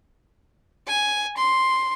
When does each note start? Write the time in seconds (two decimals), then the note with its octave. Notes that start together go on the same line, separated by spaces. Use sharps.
0.87 G#5
1.37 C6